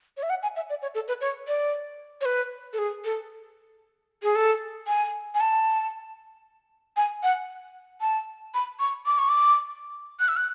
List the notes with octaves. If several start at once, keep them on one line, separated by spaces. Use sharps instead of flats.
C#5
E5
F#5
G#5
E5
D5
C#5
A4
B4
C#5
D5
C#5
B4
A4
G#4
A4
G#4
A4
G#5
G#5
A5
G#5
F#5
A5
B5
C#6
D6
C#6
D6
F#6
E6
F#6